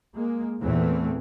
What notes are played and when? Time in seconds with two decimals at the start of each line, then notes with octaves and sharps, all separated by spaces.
0.16 G#3 A#3
0.62 E2 A#2 E3 A3 C4